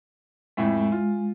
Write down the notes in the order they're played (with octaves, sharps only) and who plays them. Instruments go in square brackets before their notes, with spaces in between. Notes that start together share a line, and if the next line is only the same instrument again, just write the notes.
[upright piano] F2 A2 A3 [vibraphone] G#3
[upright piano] F4